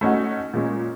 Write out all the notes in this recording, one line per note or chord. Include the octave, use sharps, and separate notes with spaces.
A3 C#4 D#4 F#4
A#2 G#3 C#4